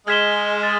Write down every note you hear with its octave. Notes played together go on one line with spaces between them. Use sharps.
G#3 F6 G#6 B6 E7 G7
A6